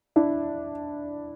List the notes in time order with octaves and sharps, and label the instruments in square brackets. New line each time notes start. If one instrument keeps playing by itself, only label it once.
[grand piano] D4 E4